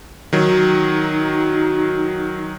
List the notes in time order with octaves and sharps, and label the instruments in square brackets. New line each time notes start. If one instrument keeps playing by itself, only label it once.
[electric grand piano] D#3 F#3 [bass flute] D#4